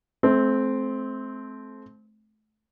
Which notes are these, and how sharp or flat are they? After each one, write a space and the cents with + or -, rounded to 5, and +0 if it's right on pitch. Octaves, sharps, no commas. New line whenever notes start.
A3 -35 C4 +0